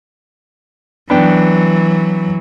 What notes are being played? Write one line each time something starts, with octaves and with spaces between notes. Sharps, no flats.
E3 F#3 B3 D4 G5